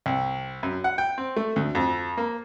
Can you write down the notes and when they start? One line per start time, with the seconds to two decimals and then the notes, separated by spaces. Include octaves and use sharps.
0.06 C2
0.63 F#2
0.84 F#5
0.98 G5
1.18 C4
1.36 A3
1.56 D2
1.75 F2
2.17 A#3